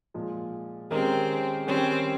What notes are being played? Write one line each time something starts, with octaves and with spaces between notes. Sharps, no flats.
A#2 F3 G#3
D#3 G#3 C4 C#4 G4 A#4
D#3 G3 C4 C#4 G4 C#5